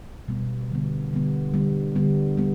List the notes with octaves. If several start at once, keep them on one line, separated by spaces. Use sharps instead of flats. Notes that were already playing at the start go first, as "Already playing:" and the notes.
B2 G3 B3
D3 G3 B3
D3 G3 B3
D3 G3 B3
D3 G3 B3
G3 B3